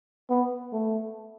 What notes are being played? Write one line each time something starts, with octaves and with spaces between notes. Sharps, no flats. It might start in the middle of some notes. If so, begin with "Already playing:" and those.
B3
A3